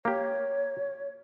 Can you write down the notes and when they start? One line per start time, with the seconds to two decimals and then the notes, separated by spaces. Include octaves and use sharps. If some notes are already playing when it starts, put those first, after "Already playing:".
0.05 A#3 G4 C#5